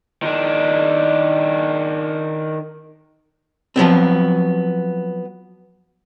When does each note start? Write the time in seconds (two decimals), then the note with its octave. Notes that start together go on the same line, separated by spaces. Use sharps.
0.23 D#3 D4
3.76 F3 F#3 B3 C4